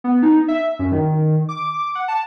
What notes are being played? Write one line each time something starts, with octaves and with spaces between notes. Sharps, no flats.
B3
D#4
E5
F#2
D#3
D6
F#5
A5